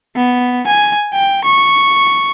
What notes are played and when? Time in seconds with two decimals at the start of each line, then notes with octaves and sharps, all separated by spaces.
0.16 B3
0.67 G#5
1.14 G5
1.45 C#6